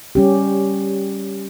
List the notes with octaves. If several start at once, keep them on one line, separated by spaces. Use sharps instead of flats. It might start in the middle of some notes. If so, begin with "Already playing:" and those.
G3 C#4 G4